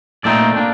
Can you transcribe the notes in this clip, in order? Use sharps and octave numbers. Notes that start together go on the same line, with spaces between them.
A#2 A3 C4 D#4 D5
A#3 D4